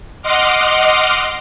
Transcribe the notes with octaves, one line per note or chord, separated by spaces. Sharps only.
D#5 F#5 C6 D6 F6